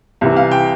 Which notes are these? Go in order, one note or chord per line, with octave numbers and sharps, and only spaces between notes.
C2 C3 E3
F5
G5